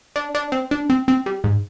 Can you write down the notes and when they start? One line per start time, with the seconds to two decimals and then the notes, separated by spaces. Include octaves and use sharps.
0.16 D4
0.35 D4
0.52 C4
0.71 D4
0.90 C4
1.08 C4
1.26 G3
1.44 G#2